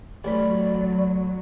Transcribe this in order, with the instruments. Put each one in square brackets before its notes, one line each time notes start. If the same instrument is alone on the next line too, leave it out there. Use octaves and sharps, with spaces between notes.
[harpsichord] A1 B5 [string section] F#3 [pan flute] D5